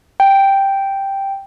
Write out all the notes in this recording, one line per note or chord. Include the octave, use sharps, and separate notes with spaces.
G5